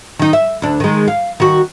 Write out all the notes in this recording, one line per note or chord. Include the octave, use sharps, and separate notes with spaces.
D#3 D#4
E5
D2 D4
D#3 G#3
F5
D#3 F#4